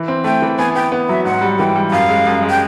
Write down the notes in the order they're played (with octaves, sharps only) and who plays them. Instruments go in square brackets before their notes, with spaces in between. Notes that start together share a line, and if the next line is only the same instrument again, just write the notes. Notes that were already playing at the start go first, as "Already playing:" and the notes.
Already playing: [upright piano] E3
C4
[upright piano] A3 [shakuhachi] G5
[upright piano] E3
[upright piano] B3 [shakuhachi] G#5
[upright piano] B3 [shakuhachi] G5
[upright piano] B3
[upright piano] F#3 [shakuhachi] E5
[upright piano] G#2 [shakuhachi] F#5
[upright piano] G3
[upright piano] E3 [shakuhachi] G5
[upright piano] G3
[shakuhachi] F#5
[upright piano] F#2 [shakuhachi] F5
[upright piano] G#3
F#2
G#3
[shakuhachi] G5